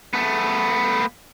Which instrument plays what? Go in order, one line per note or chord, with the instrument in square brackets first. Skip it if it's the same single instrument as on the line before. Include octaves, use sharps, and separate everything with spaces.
[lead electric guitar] A3 B3